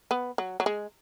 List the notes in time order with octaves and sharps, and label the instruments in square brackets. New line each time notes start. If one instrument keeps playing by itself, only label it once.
[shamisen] B3
F#3
F#3
G#3